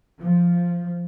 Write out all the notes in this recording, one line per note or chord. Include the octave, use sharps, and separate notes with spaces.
F3